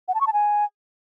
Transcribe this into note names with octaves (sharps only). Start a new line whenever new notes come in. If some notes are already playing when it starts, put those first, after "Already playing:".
F#5
A5
C#6
A5
G#5